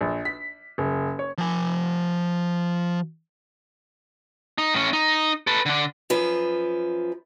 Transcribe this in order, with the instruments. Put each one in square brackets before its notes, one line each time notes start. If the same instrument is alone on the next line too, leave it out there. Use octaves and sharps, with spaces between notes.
[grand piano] A#1
B6
F#1
C#5
[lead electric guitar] F3 G#5
D#4
A2 C#4
D#4
A4 B4
D3 D4
[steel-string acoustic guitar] F#2 F3 B4